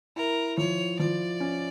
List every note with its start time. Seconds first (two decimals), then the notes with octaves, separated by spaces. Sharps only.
0.16 E4 A#4
0.58 F3 C#5
0.99 F3 D5
1.40 C#4